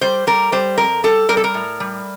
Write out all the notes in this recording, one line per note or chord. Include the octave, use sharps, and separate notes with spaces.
G3 C5
G3 A#4
G3 C5
F2 A#4
G3 A4
G3 A#4
A4
A#4
A2
G3